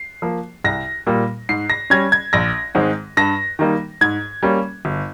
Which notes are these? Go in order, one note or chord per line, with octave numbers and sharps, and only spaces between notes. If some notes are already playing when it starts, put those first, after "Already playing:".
Already playing: C7
F3 A#3
C2 A#6
A#2 G3 A#3
G#2 C7
A#6
G3 C#4 G#6
G#6
A#1 A#6
G#2 D#3 G#3 C4
G2 A#6
D#3 G3 A#3 D#4
G#2 G#6
G3 A#3 C#4
G1